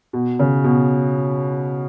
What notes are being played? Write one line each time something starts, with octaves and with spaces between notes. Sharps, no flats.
B2
C#3
B2